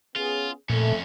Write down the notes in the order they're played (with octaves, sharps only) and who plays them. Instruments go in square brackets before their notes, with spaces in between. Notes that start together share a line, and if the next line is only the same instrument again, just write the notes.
[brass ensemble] B3 C#4 G#4 [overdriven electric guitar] F4
[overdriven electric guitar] F2 C#4 [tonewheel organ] A#2 [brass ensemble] A3